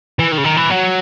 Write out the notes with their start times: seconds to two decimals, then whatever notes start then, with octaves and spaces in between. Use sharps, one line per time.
0.19 E3
0.32 D#3
0.38 C#3
0.44 D#3
0.57 E3
0.70 F#3